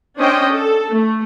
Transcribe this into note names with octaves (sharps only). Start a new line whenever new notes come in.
C#4 D4 C5 D#5 G5
A4
A3